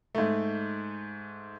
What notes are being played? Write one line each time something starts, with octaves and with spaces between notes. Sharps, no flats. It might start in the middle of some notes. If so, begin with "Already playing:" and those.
G#2 A3